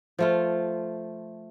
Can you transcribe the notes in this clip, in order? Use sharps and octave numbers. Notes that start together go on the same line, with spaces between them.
F3 A3 F4